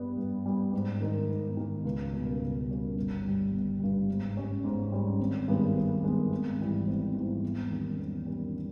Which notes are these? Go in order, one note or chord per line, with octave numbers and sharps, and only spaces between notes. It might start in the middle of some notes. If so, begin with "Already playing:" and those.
Already playing: G2 G3 B3
G2
G3 B3
G#2
D#3 A#3 D#4
G#2
D#3 A#3 D#4
C#2
B2 G3 A#3 C#4
C#2
B2 G3 A#3 C#4
G1
G2 G3
G1
G2 G3
G#2
G3 C#4
G#2
G3 C#4
G#1
G2 D#3 G#3 B3
G#1
G2 D#3 G#3 B3
G#1
G#2 E3 G3
G#1
G#2 E3 G3
E2
D#3 G3 A#3 C#4
E2
D#3 G3 A#3 C#4